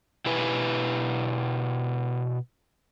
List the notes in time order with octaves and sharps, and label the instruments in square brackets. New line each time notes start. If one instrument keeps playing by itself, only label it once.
[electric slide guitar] B2 E4 G4 B4 G#5